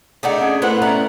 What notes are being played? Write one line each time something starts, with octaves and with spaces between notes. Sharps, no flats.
A3 D4 D#4 G#4 D5 F#5
C#4 G#4
A2 B3 E4 B4 C5 F#5
C#4 A#4 D5 E5